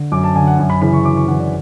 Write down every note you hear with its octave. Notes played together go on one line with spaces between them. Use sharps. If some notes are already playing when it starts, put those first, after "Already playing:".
Already playing: D3
F#2 D6
A5
D3 G#5
F#5
F#2 G#5
B5
C#3 E3 B5
C#6
F#2 D6
C#6
C#3 E3 F#5
D5